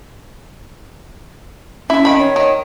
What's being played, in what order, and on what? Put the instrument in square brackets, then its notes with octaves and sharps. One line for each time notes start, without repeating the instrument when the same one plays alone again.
[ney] C#4 [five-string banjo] E4
[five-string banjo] D#3 B5
[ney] C#5
[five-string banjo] D#3